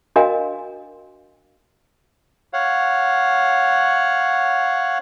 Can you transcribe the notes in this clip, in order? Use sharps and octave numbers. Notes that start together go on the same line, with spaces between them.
D4 F#4 A#4 D#5 F5 G#5
C#5 F5 F#5